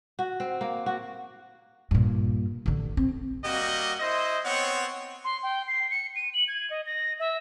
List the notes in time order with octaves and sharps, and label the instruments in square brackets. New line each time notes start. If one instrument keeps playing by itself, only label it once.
[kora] F#4
C4
A#3
F#4
[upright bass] G2 A#2
A1 D3
C4
[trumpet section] G3 A#3 F#4 D#5
E4 C5 D#5
B3 C4 C#5 F#5
[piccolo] C6
G5
C7
C#7
D#7
F#7
G#6
D#5
A#6
E5